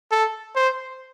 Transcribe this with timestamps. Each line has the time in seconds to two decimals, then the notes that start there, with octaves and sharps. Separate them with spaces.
0.11 A4
0.56 C5